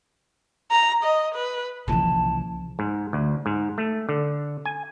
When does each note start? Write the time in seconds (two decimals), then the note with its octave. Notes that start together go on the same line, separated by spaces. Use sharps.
0.71 A#5
1.03 D#5
1.34 B4
1.88 C2 A#2 C#3 E3 F3 A5
2.79 G#2
3.13 D2
3.46 G#2
3.78 A3
4.09 D3
4.65 G#5